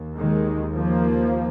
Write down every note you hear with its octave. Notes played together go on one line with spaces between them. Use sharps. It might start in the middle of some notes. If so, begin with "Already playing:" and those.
Already playing: D#2
D#3 G#3
F3 A#3